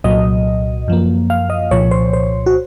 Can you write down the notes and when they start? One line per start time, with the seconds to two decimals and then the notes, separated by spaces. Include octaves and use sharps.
0.04 C2 A#2 F#3 D#5
0.88 F#2 F3 A#3
1.30 F5
1.50 D#5
1.71 C2 A#2 F3 C#5
1.91 C5
2.13 C5
2.46 F#4